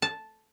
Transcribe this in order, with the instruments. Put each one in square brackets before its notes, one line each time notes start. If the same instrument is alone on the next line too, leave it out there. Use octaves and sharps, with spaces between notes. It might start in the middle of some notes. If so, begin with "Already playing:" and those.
[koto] A5